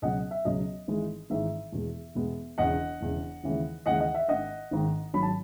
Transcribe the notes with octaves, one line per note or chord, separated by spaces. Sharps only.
C#2 B2 F#3 D#5 F#5
E5
C#2 B2 F#3 D#5
G#1 G#2 E3 G#3
G#1 G#2 E3 G#3 E5
E2 B2 G#3 B3
E2 B2 G#3 B3
E1 E2 C#3 D#5 F#5
E1 E2 C#3
D#2 C#3 E3 G#3
D#2 C#3 E3 G#3 D#5 F#5
D#5 F#5
E5
G#1 G#2 D#3 D#5 F#5
G#1 G#2 D#3
G#1 G#2 F#3 B5
A5